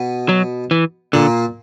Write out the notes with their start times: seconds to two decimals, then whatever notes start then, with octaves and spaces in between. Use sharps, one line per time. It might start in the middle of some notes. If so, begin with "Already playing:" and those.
Already playing: B2 B3
0.29 F#3
0.71 E3
1.13 A#2 D3 A#3